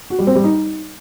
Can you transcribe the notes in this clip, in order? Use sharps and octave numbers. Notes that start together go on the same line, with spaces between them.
F#4
G3
C4
G3
D#4